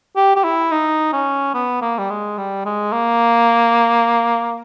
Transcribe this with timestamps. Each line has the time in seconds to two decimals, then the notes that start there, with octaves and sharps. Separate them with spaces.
0.16 G4
0.36 G4
0.44 E4
0.72 D#4
1.13 C#4
1.55 B3
1.82 A#3
1.99 G3
2.10 G#3
2.38 G3
2.65 G#3
2.93 A#3